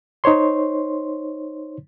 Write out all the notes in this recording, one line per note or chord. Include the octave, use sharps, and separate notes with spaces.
D#4 C5 C#5 C6